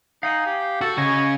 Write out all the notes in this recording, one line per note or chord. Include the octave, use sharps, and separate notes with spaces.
D#4 F5 F#5 G#5
G4
F#4 A4
C#3 F#4 D#5 G#5 C#6